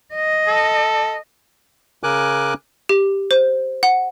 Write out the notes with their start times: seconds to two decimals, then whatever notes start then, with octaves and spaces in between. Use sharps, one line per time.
0.15 D#5
0.48 A4
2.03 C#3 A#4 G#5 D6 F#6
2.89 G4
3.31 C5
3.83 F#5